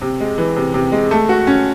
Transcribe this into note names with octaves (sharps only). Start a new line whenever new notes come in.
C3
G#3
E3
C3
C3
G#3
A3
F#4
C#4